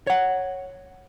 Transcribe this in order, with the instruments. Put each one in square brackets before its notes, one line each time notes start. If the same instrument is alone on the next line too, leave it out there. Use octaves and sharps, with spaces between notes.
[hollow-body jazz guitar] C#5 F#5